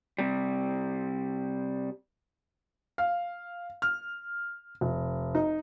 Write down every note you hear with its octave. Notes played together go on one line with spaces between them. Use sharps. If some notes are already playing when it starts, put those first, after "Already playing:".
C3 G3
F5
F6
F1
D#4